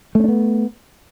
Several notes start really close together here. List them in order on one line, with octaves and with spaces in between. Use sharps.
A3 C#4 D4 B3